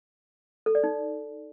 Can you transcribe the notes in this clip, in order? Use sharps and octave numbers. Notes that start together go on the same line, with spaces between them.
A4
D5
D#4